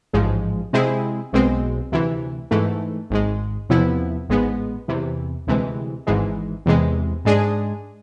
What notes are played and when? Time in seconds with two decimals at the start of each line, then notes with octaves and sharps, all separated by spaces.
0.13 A1 G#2 F3 G#3
0.73 C3 G#3 C4 E4 G#4
1.33 B1 B2 G#3 C4
1.92 D2 C3 E3
2.51 G#2 E3 A3
3.10 G#1 G#2 G#3
3.69 E2 C3 F3 B3 E4
4.29 A1 G#2 G#3 B3
4.88 E2 C3 E3
5.47 D2 C3 E3 G#3
6.07 G#1 G#2 E3 G#3
6.66 E2 C3 E3 G#3
7.25 G#2 G#3 D4 G#4